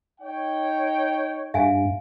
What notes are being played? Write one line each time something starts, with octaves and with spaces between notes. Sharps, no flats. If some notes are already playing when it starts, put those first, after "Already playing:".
D#4 C#5 G5
G2 E5 F5 G#5